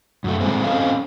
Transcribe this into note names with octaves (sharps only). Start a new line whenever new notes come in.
F#2 A3
A2 G#3 A3 C4
C4 C#4 A4 C5 D#5 F5